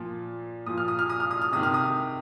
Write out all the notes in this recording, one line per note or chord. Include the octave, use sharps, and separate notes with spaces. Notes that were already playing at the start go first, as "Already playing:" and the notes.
Already playing: A#2 F3
A#2 F3 D#6
F6
D#6
F6
D#6
F6
D#6
F6
C3 D#3 D#6
F6
D#6